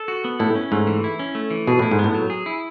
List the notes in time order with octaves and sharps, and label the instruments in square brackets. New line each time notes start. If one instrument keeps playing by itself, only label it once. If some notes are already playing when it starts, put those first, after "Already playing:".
Already playing: [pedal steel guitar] A4
F#4
B3
[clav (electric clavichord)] A2 [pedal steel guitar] E4
[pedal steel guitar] C#4
[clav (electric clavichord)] G#2 [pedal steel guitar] A3
[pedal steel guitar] E3
E4
C#4
A3
E3
[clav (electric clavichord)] B2 [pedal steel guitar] G#4
[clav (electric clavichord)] A2 [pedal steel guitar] E4
[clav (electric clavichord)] G#2
[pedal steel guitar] B3
[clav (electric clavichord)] A2
[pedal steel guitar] F#3
G#4
E4